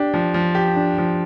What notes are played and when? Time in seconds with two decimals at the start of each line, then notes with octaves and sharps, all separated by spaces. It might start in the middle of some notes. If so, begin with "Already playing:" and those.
Already playing: D4 G4
0.14 F3
0.34 F3
0.55 G4
0.76 D4
0.98 F3